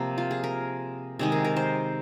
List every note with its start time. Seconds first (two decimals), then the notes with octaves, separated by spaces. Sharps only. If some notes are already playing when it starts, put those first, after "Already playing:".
Already playing: C3 F3 A#3 C5
0.18 F4
0.31 G#4
0.44 A#4
1.19 C3 D#3 G#3 G#4
1.32 A#4
1.45 A#4
1.56 C5